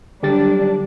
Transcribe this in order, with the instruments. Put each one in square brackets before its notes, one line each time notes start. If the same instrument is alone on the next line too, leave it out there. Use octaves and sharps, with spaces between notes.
[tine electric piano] D3 G4 A6 [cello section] F#3 G3 D4